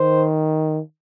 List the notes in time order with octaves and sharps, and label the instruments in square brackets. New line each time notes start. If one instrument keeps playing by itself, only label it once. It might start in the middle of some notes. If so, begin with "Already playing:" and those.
Already playing: [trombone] D#3 [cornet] C5